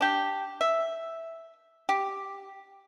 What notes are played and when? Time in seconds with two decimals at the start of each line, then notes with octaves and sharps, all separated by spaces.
0.01 D4 G4
0.61 E5
1.89 G4